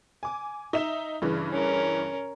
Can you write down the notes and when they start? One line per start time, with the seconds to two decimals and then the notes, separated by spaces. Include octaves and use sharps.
0.23 G#5 D6
0.73 D#4 E5 E7
1.22 G2 C#3 E3
1.52 C#4 A#4